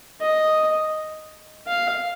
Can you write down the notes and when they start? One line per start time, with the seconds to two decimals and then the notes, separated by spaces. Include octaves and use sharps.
0.21 D#5
1.67 F5